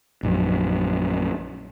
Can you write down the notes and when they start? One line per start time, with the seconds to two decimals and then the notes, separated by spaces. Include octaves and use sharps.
0.23 A#1 F#2